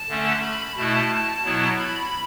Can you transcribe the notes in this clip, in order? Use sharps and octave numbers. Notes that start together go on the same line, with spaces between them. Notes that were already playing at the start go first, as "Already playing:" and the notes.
Already playing: A5
D3 A3 C#4
B5
B2 A3 E4 A5
B2 F#3 B3 E4
B5